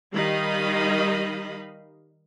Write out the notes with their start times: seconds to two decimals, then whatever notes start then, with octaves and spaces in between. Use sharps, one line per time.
0.13 D#3 G3 D#4 D#5 F5 B5